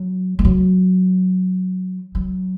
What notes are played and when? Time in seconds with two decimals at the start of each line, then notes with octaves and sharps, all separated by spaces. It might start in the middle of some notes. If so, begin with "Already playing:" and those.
Already playing: F#3
0.39 G#3
0.45 F#3
2.15 F#3